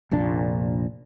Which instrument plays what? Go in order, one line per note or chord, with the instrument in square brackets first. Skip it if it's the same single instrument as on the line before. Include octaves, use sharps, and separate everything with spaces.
[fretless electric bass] F1 A#1 A#2 D4